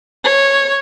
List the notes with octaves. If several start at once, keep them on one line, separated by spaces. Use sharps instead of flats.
C#5